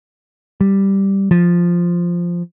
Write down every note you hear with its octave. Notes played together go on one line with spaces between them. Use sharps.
G3
F3